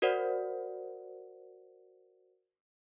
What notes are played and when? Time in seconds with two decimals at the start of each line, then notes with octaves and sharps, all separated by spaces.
0.02 F#4 A#4 C5 D5 F#5